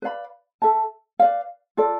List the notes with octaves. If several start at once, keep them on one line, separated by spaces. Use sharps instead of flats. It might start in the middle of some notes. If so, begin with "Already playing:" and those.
B4 D5 F5 B5
A4 E5 A5
B4 D5 F5
F4 A4 D5